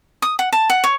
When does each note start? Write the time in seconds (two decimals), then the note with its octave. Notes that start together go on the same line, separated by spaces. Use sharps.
0.22 D#6
0.39 F#5
0.53 A5
0.70 F#5
0.84 C#5